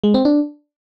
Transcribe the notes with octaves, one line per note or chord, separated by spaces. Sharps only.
G#3
C4
D4